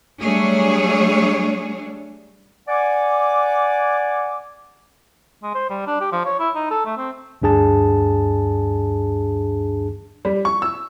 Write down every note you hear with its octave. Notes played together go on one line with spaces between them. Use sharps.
F#3 G3 A3 D4 G#4 C#5
D5 F#5 G#5 D6
G#3
C5
G3
D4
G4
F3
C#5
E4
D#4
A4
A3
C4
D2 G2 D4 G#4 A5
G3
C#6
E6